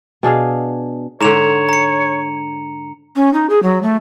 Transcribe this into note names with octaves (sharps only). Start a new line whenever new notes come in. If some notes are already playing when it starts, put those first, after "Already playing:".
B2 D4 G#4 F5
G#2 D3 C#5 A#5 E7 F7
A#5 C#7
C#4
D#4
G#4
F#3
A3